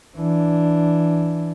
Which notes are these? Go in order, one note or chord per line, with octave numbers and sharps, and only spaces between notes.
E3 D4